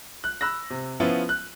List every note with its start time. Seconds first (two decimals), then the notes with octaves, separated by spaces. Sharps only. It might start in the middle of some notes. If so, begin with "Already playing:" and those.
0.24 F#6
0.41 B5 E6 F#6 A#6
0.70 C3
1.00 F3 B3 C#4 E4 F4
1.29 F#6